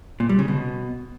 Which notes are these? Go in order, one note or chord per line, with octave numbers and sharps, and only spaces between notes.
A#2
G3
C#3
B2